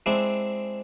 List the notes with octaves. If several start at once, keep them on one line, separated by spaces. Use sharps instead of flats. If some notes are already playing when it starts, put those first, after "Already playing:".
G#3 C4 D4 E4